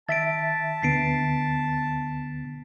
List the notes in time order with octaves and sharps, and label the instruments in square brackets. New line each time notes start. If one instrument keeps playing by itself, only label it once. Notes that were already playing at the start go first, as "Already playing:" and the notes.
[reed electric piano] D#3 E5 [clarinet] A5 [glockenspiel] A6 B6 D7
[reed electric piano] D2 D3 B3 [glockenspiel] B6 C7 D7